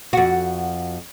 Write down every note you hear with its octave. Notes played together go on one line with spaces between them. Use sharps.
F2 F#4